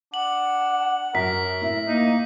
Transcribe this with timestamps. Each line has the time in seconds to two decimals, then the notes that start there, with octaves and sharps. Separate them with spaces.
0.14 D4 F#5 F#7
1.15 F#2 A#4 B6
1.62 A2 E5
1.88 A#3 D#4